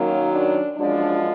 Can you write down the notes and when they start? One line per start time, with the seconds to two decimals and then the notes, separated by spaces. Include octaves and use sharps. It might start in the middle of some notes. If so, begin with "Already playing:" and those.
Already playing: F#2 D#3 F#3 A#3
0.32 D4
0.77 F#2 F3 G#3 D4